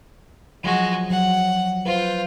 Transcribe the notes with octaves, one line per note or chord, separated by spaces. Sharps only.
F3 F#3 G#3 F#4
F#3 F#5
F4 B4 C5